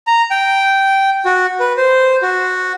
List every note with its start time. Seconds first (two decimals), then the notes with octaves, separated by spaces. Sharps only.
0.07 A#5
0.31 G5
1.25 F#4
1.60 B4
1.77 C5
2.22 F#4